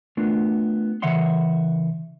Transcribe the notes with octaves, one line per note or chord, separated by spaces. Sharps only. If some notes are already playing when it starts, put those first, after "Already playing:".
A3 B3 D4 F4 A#4
C#3 E3 C#5 E5 F#5 C6